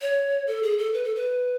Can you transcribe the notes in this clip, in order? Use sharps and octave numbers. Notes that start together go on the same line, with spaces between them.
C#5
A4
G#4
A4
B4
A4
B4